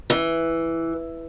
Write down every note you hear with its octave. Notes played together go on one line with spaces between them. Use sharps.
E3